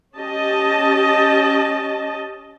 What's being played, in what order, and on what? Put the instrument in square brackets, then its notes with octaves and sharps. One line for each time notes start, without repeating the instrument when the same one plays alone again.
[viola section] C#4 G4 D#5 A5